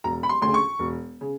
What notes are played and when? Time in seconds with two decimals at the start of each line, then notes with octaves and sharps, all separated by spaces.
0.04 E1 A#5
0.23 B5
0.29 C6
0.42 D2 C#3 C6
0.54 C#6
0.79 E1
1.21 C#3